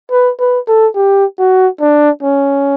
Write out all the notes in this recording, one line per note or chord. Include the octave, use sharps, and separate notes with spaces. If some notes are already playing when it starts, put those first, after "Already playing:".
B4
B4
A4
G4
F#4
D4
C#4